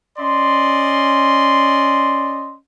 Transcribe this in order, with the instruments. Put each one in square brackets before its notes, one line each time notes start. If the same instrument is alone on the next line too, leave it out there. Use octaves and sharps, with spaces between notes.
[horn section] C#4 D5 D#5 C6